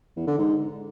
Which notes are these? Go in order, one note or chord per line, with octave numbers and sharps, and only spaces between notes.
E2
D3
G#2